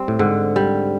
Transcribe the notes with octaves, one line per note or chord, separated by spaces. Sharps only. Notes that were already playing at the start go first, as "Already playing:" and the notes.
Already playing: G3 C4
A2
G#2 D3
G3